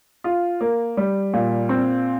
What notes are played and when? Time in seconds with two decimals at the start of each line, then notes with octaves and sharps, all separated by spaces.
0.24 F4
0.61 A#3
0.97 G3
1.34 A#2
1.69 C4